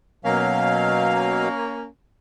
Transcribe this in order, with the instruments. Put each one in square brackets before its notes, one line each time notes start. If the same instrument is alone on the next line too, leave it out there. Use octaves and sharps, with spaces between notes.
[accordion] B2 F#3 F5 [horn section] A#3 C#4